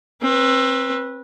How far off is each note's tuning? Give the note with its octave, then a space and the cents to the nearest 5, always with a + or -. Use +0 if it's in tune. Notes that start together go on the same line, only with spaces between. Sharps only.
C4 +25 B4 -15